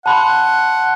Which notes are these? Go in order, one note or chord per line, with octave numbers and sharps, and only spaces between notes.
F#5 A5 B5 C6